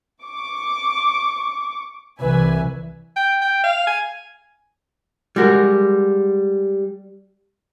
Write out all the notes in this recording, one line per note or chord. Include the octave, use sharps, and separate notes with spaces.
C#6 D6
C2 E3 B4 E5 G#5
G5
G5
F5
G#5
G3 G#3 F#4 A#4